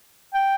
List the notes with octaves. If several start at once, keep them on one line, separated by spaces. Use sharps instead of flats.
G5